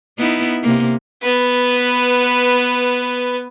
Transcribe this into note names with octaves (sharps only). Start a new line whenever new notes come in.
B3 D#4 E4
C3 A#3
B3 B4